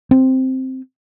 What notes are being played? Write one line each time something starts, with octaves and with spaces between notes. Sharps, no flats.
C4